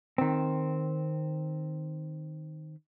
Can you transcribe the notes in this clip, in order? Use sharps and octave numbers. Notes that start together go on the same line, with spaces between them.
D#3 C4